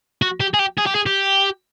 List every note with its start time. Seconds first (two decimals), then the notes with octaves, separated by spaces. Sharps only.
0.22 F#4
0.40 G4
0.54 G#4
0.59 G4
0.78 G#4
0.86 G4
0.95 G#4
1.06 G4